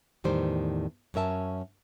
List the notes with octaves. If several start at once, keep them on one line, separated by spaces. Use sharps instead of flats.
E2 A2 D#3 G3 C5
F#2 C#4 A#4 E5 A5